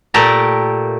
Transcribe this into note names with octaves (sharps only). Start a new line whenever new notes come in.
A#2 A3 G4 A#4 A5 A#5